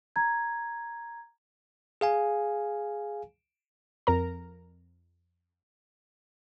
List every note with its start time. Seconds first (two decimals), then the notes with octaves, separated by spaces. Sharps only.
0.16 A#5 G#6
2.01 G#4 F5 G#5
4.07 F2 A#4 A#5